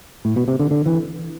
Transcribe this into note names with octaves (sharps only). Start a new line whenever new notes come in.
A2
B2
C3
D3
D3
E3